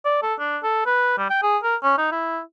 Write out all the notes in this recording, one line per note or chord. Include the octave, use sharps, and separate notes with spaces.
D5
A4
D4
A4
B4
G3
G5
G#4
A#4
C#4
D#4
E4